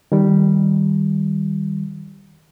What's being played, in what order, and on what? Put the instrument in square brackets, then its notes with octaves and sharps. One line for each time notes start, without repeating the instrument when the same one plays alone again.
[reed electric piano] D#3 G3